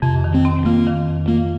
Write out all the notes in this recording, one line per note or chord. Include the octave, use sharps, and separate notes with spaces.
F2 C3
D#3
C4
C4
A#3 F4
D#3
F2
A#3 F4